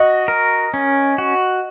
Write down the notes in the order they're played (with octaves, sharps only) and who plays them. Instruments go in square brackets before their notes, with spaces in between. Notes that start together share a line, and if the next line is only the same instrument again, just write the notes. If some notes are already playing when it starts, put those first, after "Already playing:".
Already playing: [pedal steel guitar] F#4 [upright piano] D#5
[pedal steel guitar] A#4
C#4
F#4